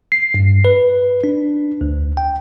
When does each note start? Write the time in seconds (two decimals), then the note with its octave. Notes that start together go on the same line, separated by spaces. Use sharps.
0.12 C7
0.34 G2
0.65 B4
1.24 D4
1.81 D2
2.17 G5